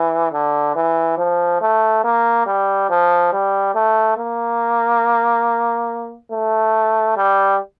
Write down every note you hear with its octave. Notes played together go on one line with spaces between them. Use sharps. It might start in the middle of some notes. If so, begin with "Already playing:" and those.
Already playing: E3
D3
E3
F3
A3
A#3
G3
F3
G3
A3
A#3
A3
G3